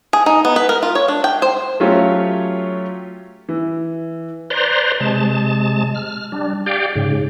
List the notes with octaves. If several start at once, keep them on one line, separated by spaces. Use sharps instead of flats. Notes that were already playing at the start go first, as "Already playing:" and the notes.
G#4
D#4
B3
B4
A#4
F4
C#5
D4
G5
C5
F#3 A3 C#4 F4 G4 C#5
E3
B4 C5 D5 A#5 C6
C3 G#3 A5
F6
G3 D4
G4 D5 F5 G5
G#2 C#3